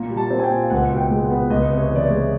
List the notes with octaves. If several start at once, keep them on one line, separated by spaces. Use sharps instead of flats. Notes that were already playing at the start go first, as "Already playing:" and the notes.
Already playing: A#2 A#3
G3
A5
C4
G#5
G5
A#2
F5
C#2 F#5
B2
G5
G#3
F#5
B3
C#2 D#5
C3
C#5
E3
D5
C#5
G#3